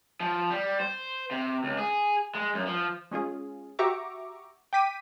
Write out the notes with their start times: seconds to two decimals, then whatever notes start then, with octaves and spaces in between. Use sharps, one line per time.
0.20 F3
0.50 G3
0.80 C5
1.31 C3
1.64 C#2
1.78 G#4
2.35 G#3
2.54 F#2
2.67 F3
3.11 G#3 C#4 F4 G#4
3.79 F#4 G4 E5 A#5 C#6 D6
4.73 G5 D6 B6 D#7